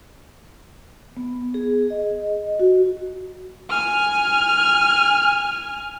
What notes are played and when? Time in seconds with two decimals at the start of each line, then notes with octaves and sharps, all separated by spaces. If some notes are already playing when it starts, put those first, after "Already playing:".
1.17 B3
1.54 G#4
1.90 D#5
2.59 F#4
3.69 G#5 F6